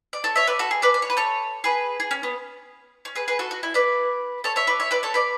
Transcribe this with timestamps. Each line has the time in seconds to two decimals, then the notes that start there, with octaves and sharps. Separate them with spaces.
0.13 D5
0.24 A4 C#5
0.36 C#5 E5
0.47 B4 D5
0.59 F#4 A4
0.71 G#4
0.82 B4 D5
0.94 D5
1.02 C#5
1.10 B4
1.17 A4 C#5
1.64 G#4 B4
2.00 G#4
2.11 C#4
2.23 B3
3.05 C#4
3.15 G#4 B4
3.28 G#4 B4
3.39 F#4 A4
3.51 F#4
3.63 E4
3.74 B4 D5
4.44 A4 C#5
4.56 C#5 E5
4.67 B4 D5
4.80 C#5 E5
4.91 B4 D5
5.03 A4 C#5
5.14 B4 D5